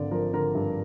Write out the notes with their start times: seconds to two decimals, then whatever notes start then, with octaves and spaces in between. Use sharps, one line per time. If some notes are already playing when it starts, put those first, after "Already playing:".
Already playing: G#1 D3 D5
0.11 F3 A#4
0.34 D3 A#4
0.55 G2